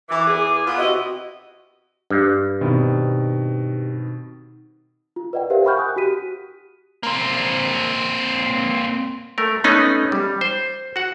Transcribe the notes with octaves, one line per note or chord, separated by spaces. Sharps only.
E3 D6
E2 G#4
B3 F4
C3 E4 F#4 D#5
G2
B2 D#3 C4
F4
B4 D5 D#5 F#5 G5
G4 A#4 C5 E5 F5
F#5 G5 B5 C#6 F6 G6
G#5 D#6 F#6
F#4 G4 B6 D#7
A#3 C4
A3 A#4
A3 B3 C#4 D#4 B4
G3
C5
F#4 F#5